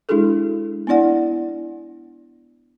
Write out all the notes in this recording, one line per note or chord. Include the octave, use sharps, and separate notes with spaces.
G#3 D4 E4 F#4 G#4 A4
B3 D4 E4 D5 F#5